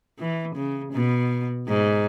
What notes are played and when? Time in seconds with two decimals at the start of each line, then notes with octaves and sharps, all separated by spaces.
0.19 E3
0.55 C#3
0.93 B2
1.68 G#2